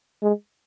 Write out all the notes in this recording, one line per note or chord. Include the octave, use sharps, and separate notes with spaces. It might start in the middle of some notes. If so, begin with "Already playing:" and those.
G#3